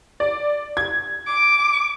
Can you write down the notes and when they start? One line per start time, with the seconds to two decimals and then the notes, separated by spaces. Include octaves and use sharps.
0.20 D5
0.77 G#6
1.27 D6